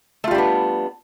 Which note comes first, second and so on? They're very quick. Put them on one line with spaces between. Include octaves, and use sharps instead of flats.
A3 F4 G3 D4 B3